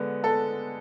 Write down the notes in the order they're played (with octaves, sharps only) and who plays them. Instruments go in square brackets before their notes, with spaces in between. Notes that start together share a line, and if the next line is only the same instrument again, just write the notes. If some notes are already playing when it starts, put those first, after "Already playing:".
Already playing: [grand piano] D3 G#3 B3
[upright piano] A4